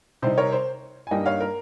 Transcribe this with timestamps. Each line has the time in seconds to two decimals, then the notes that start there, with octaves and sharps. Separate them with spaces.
0.22 C3 G3 C4 D#4 C5
0.38 A#4 C#5
0.52 C5
1.07 G#5
1.11 G2 G3 A#3 D#4 D#5 G5
1.26 C#5 F5
1.41 A#4